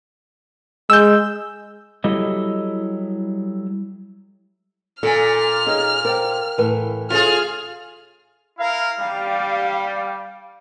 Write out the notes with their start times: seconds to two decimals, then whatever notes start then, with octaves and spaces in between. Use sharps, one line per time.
0.90 G#3 E6 G6
2.04 F#3 G3 E4 A4 D#5
5.03 A#2 A4 G#5 F6
5.66 D#4 G#4 C#5 D#5
6.05 A#4 C5 D5 G5
6.58 A2 E3 A#4 B4 A5
7.10 F4 G#4 A4 C#5 E5 F6
8.59 E4 A#4 F5
9.00 G3 F5